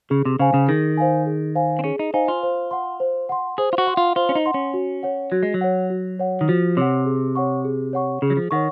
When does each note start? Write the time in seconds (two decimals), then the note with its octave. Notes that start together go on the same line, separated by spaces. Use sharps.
0.10 C#3 G#4
0.25 C3
0.39 C#3 C5 F5 G#5
0.54 C#3
0.68 D#3 G#4
0.98 C5 F5 G#5
1.26 G#4
1.55 C5 F5 G#5
1.79 C4
1.84 C#4 G#4
1.99 D#4
2.14 D#4 C5 F5 G#5
2.28 F4
2.43 C5
2.71 F#5 C6
3.00 C5
3.29 F#5 C6
3.58 G#4 C5
3.73 F4
3.78 F#4
3.87 F#5 C6
3.97 F4
4.16 F4 C5
4.29 C#4
4.35 D#4
4.46 F#5 C6
4.54 C#4
4.74 F#4
5.03 C#5 F#5
5.32 F#3 F#4
5.43 G#3
5.54 F#3
5.61 C#5 F#5
5.90 F#4
6.19 C#5 F#5
6.41 D#3
6.48 F3 F#4
6.77 C3 C#5 F#5
7.06 G#4
7.35 C#5 F#5 C#6
7.65 G#4
7.93 C#5 F#5 C#6
8.22 C#3 G#4
8.30 F#3
8.37 F3
8.51 D#3 C#5 F#5 C#6